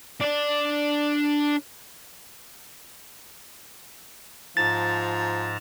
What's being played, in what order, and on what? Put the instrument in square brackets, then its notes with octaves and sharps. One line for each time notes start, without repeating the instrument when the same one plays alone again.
[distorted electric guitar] D4 D5
[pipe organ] G#2 A5 A#5 [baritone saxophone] F3 [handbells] A6